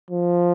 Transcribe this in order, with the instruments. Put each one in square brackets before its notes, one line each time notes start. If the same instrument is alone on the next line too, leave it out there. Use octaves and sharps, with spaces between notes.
[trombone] F3